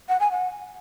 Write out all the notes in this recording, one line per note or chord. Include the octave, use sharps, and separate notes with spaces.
F#5
G#5
F#5